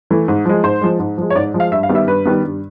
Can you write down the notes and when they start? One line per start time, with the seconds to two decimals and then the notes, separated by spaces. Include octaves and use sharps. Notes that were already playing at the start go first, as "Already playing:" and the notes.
0.11 E3 A3
0.28 G#2
0.45 F3 G#3
0.63 G#2 C5
0.81 F3 G#3
0.99 G#2
1.18 F3 G#3
1.30 C#5
1.35 G#2 D5
1.54 F3 G#3
1.60 F5
1.72 G2 E5
1.83 F5
1.89 D#3 G3 B3
1.95 E5
2.07 G2 B4
2.25 D#3 G3 B3
2.43 G2